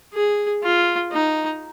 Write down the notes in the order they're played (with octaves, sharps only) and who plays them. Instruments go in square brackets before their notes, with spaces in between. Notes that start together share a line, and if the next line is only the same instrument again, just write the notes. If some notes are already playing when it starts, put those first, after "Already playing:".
[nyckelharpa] G#4
F4
D#4